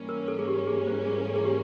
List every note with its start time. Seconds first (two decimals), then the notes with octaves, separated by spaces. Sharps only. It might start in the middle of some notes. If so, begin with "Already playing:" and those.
Already playing: G#2 E3 G3 A#3 C#4
0.09 A#4
0.28 A4
0.39 G#4
0.48 G4
0.67 G#4
0.87 C5
1.07 G#4
1.26 A4
1.36 G#4
1.45 G4